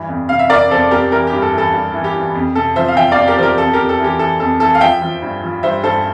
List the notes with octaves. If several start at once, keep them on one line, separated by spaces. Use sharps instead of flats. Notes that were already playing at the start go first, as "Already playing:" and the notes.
Already playing: G2 E3
F2
C3 F5
E5
F2 A#4 D5
F2 A4 C5
F2 G4 A#4
E3 G4 A#4
G4
G2
A4
E3 A4
G2
E3
G4
E3
F2
C3 A4
F3 C5 E5
F5
F3 E5 G5
D5 F5
F2
G4 A#4
F3 G4 A#4 C5
F2 A4
F2 G4 A#4
A4
E3
G4
E3 A4
F2 A4
E3 A4
F5
F3 E5 G5
F3
G2
F3
G2 C5 E5
G2 A4 C5